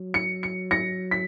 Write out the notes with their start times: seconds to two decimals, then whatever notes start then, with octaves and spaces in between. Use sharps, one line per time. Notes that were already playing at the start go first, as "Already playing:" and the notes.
Already playing: F#3
0.14 C#7
0.43 C#7
0.71 A#6 C#7
1.11 B6